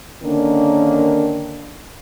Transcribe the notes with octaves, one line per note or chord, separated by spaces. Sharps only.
D3 D#3 A#3 C#4 D4